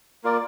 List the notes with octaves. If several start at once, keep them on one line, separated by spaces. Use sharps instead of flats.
A#3 F4 A#4 D5